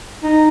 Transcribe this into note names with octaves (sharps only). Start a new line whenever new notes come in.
D#4